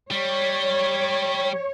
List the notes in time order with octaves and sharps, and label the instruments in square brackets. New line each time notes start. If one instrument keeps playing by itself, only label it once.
[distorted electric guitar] G3 [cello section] C#5